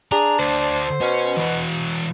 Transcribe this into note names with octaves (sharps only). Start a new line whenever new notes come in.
D4 G#4 A#5
D2 C5
B2 C#4
E3 F#4